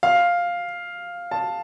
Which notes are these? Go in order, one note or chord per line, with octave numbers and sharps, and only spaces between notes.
F5
A5